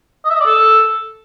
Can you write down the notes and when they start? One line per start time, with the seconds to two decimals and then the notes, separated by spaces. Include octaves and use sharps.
0.25 D#5
0.30 E5
0.35 D#5
0.41 D5
0.46 A4